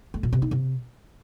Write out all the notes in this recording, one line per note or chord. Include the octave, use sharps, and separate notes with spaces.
A3
A#2
C3
D#4
C3